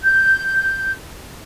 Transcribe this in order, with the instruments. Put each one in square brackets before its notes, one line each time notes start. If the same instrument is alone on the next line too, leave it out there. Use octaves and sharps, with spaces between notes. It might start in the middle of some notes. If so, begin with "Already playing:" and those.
[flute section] G6